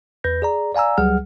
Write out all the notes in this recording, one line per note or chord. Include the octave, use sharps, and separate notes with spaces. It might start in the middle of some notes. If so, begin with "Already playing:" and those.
E2 B4 G6 A#6
G#4 D5 A#5
D5 F5 G#5 A#5 E6
C#2 F#3 G3 G#4 F#5 F6